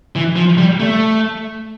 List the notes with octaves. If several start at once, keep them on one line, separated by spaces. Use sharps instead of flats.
E3
F3
G3
A3